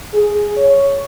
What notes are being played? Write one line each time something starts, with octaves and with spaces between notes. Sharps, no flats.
G#4
C#5